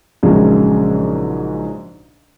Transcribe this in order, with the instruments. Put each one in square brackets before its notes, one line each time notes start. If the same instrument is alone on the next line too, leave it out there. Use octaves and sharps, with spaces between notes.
[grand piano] A#1 G#2 C#3 F#3 G#3